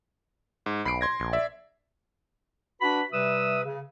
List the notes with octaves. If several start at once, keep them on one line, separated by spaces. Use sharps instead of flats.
G#2
B1 B5 C7 D7
C6 G#6 A#6
A#1
D5 E5
D4 F#4 B4 B5
C3 G3 B4 E5 D#6 E6
C#3